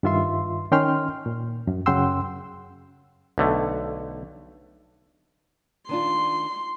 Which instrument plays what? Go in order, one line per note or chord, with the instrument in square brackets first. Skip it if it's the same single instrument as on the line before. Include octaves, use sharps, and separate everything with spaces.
[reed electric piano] G2 D#3 F4 E5 C6
D#3 C#4 G5 C6 F6
A#2
F#2
F#2 C#3 F#5 G5 C6 E6
[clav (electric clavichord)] B1 D3 A3
[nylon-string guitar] D#3 D4 F4 [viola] C6